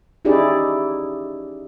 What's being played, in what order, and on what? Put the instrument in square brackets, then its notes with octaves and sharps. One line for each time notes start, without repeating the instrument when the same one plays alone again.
[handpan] C#4 D#4 E4 G4 G#4 D5